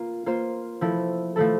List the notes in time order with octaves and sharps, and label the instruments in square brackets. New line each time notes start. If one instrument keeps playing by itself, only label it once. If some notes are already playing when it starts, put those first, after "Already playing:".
Already playing: [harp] A#3 F4
A#3 F4 C5
F3 A3 E4 A4
F3 A3 E4 A4